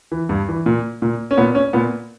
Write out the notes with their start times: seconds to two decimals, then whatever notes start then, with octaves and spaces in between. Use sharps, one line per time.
0.12 E3
0.29 G2
0.48 E3
0.66 A#2
1.02 A#2
1.31 C#4
1.38 A#2 B3
1.55 C#4
1.73 A#2 B3